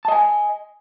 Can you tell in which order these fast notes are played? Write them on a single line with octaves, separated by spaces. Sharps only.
A5 D#5 G#5